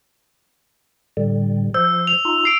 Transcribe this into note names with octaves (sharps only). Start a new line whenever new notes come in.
A2 D3 G3
F3 C5 E6
F7
D#4 F4
C7 D7